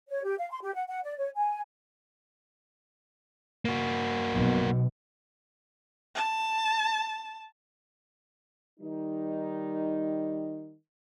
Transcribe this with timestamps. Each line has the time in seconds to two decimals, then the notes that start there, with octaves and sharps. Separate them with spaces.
0.09 C#5
0.24 G4
0.38 F5
0.51 C6
0.63 G4
0.75 F#5
0.88 F#5
1.04 D5
1.18 C#5
1.36 G#5
3.65 A#3 F#4
4.33 B1 B2
6.15 A5
8.80 D#3 G3 D#4